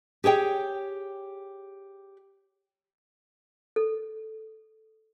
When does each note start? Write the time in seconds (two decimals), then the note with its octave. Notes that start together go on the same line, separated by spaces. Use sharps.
0.24 G4 G#4 C#5 G5
3.76 A4